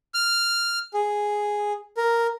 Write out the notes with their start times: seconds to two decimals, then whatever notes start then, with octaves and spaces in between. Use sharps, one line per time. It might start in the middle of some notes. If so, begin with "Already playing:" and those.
0.14 F6
0.94 G#4
1.97 A#4